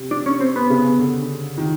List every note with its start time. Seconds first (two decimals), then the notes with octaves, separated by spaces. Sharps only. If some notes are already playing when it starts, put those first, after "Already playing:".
Already playing: C3
0.11 D4
0.26 C#4
0.41 C4
0.56 B3
0.70 C#3
0.99 D3
1.58 D#3